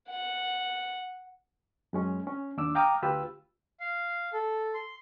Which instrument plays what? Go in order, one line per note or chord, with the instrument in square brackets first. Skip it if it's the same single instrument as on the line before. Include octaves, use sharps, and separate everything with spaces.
[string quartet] F#5
[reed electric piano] F#2 G#3 C#4
C#4
D#2 D4 D6 E6
F5 G5 A#5 D6 D#6 F6
D2 F4 G4 B4 E6
[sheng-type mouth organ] F5
A4
C6